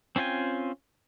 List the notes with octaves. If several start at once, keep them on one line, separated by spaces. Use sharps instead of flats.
C4 C#4 F4 G5 G#5